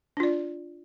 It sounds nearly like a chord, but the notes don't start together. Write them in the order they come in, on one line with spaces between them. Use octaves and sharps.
D4 F4 D5